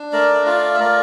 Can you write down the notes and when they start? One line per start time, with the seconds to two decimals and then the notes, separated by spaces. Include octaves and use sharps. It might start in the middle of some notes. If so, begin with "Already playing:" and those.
Already playing: D4
0.12 A3 A#4 D5
0.46 F4 D5 F5
0.74 E5
0.80 A3 A#4 D5